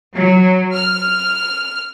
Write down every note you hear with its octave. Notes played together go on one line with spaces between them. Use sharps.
F#3
F6